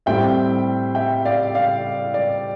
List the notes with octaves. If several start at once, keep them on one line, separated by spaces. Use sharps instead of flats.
A2 G3 C4 E5 G5
E5 G5
D5 F5
D5 F5
D5